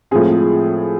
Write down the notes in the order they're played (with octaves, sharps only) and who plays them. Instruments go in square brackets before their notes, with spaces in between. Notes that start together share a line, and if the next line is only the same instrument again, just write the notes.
[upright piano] A2 F3 G#3 C4 G#4